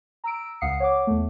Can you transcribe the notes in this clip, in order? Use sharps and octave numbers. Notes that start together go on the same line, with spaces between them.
A#5 E6 D7
C#2 F5 F#5 D#6 C7 C#7
C#5 F#5 D6
E2 A3